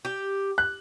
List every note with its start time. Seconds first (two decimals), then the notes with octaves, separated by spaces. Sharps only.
0.05 G4
0.58 F#6